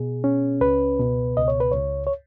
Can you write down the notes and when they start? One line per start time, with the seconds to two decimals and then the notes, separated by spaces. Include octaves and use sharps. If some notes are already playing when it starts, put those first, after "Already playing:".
Already playing: B2 G#4
0.24 C#4
0.61 C#2 B4
0.99 B2
1.37 C#2 D#5
1.48 C#5
1.60 B4
1.72 C#2 C#5
2.07 C#5